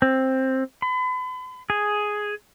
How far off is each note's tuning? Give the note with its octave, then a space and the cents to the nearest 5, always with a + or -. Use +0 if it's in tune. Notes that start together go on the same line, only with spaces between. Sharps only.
C4 +10
B5 +40
G#4 +5